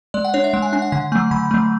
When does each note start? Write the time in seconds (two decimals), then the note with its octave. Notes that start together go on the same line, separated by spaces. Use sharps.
0.14 G#3 D5
0.24 F#5
0.34 D4 C#5
0.44 E5
0.53 G#3 F#5
0.62 G#5
0.73 D4 G#5
0.82 F#5
0.92 D3 F#5
1.12 F#3 A3 G#5
1.31 D3 B5
1.51 F#3 A3